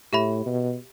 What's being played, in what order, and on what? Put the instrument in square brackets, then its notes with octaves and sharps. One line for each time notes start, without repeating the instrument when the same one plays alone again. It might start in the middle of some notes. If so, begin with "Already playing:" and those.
[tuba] A2 [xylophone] G4 E5 B5
[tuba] B2